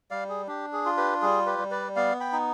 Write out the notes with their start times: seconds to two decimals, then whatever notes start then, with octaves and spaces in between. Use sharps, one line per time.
0.11 G3 D5 F5
0.29 G#4
0.47 D4 G4
0.73 G#4
0.85 F4
0.97 G4 B4
1.22 G3 G#4
1.46 G4 B4
1.59 G3
1.71 B4 D5
1.96 B3 D5 F5
2.20 G5 B5
2.33 D#4